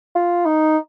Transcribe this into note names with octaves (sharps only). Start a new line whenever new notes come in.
F4
D#4